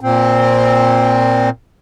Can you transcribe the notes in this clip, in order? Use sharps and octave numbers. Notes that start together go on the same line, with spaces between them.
A#2 C4